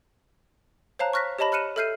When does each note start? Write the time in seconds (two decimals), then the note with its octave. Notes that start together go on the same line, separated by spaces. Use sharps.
0.99 C5 C#5 F5 A5 A#5 F#6
1.13 C#6 F6 F#6 A#6 B6
1.39 G4 C#5 D#5 A5 B5 A#6
1.52 B5 F6 F#6 C#7 D#7 E7
1.76 A4 E5 F6 G6 C7 D#7